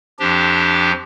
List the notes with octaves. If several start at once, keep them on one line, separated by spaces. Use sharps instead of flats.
F2 F3 D4 G4